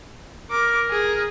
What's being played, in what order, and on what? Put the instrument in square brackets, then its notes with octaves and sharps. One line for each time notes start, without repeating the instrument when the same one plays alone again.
[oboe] A#4 [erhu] D6
[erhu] G#4